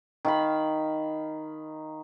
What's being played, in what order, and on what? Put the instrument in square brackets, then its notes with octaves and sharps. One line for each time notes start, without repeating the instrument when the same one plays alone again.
[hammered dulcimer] D#3 F5 B5